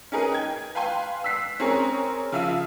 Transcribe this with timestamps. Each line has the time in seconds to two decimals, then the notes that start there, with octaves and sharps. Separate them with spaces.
0.12 C#4 D#4 G#4 A#4 B4
0.32 G5 G#6
0.75 B4 F5 G5 G#5 C6
1.24 E6 F#6 B6 C7
1.60 C4 C#4 G#4 A#4 C#5 A#5
2.32 C#3 F3 E5 F5 E6 D#7